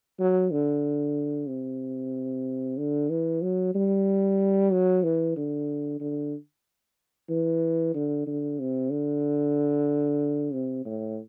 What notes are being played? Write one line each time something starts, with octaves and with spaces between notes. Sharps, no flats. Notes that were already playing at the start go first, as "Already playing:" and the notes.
F#3
D3
C3
D3
E3
F#3
G3
F#3
E3
D3
D3
E3
D3
D3
C3
D3
C3
A2